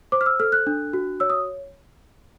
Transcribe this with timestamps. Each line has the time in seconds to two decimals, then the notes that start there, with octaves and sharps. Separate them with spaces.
0.12 C5 D6
0.21 F6
0.26 E6
0.40 A4 F6
0.52 F#6
0.67 D4
0.93 F#4
1.20 C#5 E6
1.30 D#6